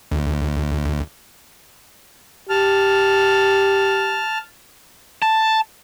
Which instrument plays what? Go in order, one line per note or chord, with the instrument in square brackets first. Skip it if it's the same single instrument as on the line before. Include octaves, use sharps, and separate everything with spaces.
[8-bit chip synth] D2
[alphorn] G4 [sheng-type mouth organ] A5 F6
[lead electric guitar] A5